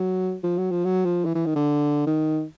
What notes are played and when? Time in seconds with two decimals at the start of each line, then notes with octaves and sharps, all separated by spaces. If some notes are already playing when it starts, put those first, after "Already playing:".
Already playing: F#3
0.43 F3
0.58 F#3
0.71 F3
0.85 F#3
1.05 F3
1.25 E3
1.35 E3
1.46 D#3
1.55 D3
2.07 D#3